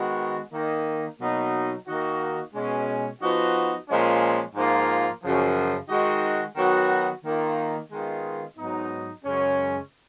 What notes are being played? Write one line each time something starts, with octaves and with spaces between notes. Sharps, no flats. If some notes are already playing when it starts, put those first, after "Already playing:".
Already playing: D#3 G#3 B3 F#4
D#3 A#3 D#4
B2 F#3 A#3 D#4
D#3 A#3 D#4 F#4
B2 G#3 C#4
F3 B3 D#4 F#4
A#2 F3 G#3 C#4
G#2 F3 A#3 F4
F#2 C#3 F3
D#3 G#3 D#4 F#4
D#3 F#3 B3 F#4
D#3 A#3 F4
D#3 G#3 B3 F4
G#2 F#3 B3 D#4
F#2 C#3 G#3 C#4